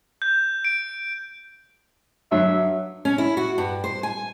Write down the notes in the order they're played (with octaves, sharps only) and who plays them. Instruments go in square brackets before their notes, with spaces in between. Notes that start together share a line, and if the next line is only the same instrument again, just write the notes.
[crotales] G6
D7
[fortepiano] G2 F#3 [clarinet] E5
[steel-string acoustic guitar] C#4
E4
F#4
G2
C5
G#5